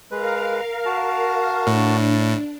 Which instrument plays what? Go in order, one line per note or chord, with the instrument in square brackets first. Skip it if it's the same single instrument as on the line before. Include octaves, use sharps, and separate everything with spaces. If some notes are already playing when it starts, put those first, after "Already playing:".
[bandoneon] G#3 B4 [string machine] A#4 F5
[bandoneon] F#4 A5
[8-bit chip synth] A2 [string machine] D4